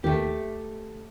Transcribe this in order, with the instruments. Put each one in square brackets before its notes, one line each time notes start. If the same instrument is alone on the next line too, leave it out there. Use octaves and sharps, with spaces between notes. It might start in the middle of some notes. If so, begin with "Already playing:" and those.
[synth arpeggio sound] D#2 D#3 [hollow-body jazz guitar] A3 G4